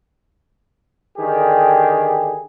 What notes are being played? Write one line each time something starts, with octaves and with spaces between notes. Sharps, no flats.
D3 D#3 G4 G#4